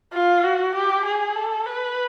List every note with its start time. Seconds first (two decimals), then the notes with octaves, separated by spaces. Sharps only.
0.13 F4
0.43 F#4
0.75 G4
1.05 G#4
1.35 A4
1.66 B4